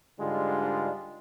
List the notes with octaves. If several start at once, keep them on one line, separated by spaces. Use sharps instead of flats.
G#2 D3 G3 G#3 D4 F4